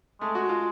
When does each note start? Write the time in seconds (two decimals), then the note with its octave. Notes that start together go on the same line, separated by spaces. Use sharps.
0.21 G#3 A3
0.35 F#4
0.49 F4